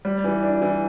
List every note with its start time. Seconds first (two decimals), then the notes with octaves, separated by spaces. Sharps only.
0.05 G3
0.24 E3
0.43 D4
0.62 E3